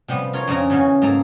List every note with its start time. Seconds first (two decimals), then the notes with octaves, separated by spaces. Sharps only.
0.08 C3 F3 G3 B3
0.33 F4 A#4 C#5 F5
0.48 F2 C#3 C4 D4 A#4 A#5
0.70 E2 C#3 E3 C#4 F#4
1.02 G#2 A#3 A4 A#5